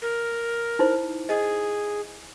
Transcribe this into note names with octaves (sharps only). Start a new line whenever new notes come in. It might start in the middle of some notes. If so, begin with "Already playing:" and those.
A#4
D#4 E4 C5
G#4 D#5